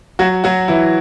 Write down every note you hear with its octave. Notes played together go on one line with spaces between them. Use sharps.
F#3 F#4
F#3 F#4
E3 E4